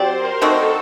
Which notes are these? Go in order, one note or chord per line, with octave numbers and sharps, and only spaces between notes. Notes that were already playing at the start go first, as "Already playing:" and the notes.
Already playing: F#3 C4 G4 C5 D5
A#4
D#3 A3 C4 F#4 A4